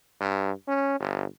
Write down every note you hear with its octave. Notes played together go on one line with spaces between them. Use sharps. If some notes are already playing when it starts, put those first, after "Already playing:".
G2
C#4
G1